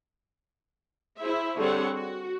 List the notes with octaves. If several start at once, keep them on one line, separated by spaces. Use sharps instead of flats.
E4 G#4 C5 E5
D3 G3 C4 G#4 C#5 F#5
F#4